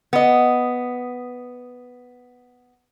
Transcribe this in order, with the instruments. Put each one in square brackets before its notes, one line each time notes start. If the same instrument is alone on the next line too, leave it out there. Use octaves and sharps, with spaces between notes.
[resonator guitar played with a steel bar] B3 D#5